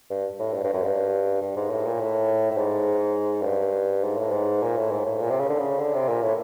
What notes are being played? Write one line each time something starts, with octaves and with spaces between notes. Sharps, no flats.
G2
A2
G2
G2
F#2
G2
G2
G#2
A2
A#2
A2
A2
G#2
F#2
G2
G#2
A2
G#2
A#2
A2
G#2
A2
A#2
C3
C#3
D3
C#3
D3
C3
A#2
A2